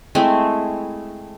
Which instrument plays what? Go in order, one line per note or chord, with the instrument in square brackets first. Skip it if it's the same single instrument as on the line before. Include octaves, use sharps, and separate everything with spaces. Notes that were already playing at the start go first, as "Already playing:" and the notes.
[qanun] G#3 A3 C4 E4